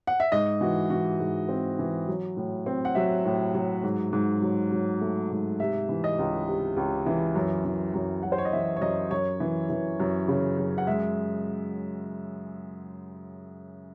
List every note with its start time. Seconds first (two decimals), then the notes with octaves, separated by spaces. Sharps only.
0.07 F#5
0.20 E5
0.32 G#2 D#5
0.61 E3 F#4
0.90 E3 F#4
1.20 G#2
1.49 C4
1.79 E3
2.08 F#3
2.37 A2
2.66 C4
2.85 F#5
2.95 F#3 E5
3.26 A2
3.55 F#3
3.83 G#2
4.13 G#2
4.42 F#3
4.72 F#3
5.01 A3
5.31 G#2
5.60 C3 E5
5.89 E3
6.04 D#5
6.19 C#2
6.47 C3
6.77 C#2
7.06 E3
7.35 F#2
7.65 E3
7.94 F#2
8.23 F#2 F#5
8.32 C5
8.38 C#5
8.45 D#5
8.53 E3 E5
8.76 C#5
8.81 F#2 D#5
9.11 F#2 C#5
9.40 E3
9.70 E3
10.00 F#2
10.28 C#3
10.58 F#2
10.78 F#5
10.87 G#3 E5